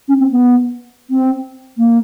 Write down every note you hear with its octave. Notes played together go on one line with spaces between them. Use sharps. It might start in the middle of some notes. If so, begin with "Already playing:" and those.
C#4
C4
B3
C4
A#3